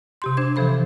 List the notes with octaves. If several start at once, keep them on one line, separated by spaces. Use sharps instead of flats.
C3 G4 C6
D4 C5 G#6
C3 E3 F3 A4 C5 B5